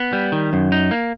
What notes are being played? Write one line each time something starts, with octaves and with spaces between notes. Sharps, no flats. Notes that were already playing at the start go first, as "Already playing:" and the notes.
Already playing: B3
G3
D#3
F#2
D#4
A#3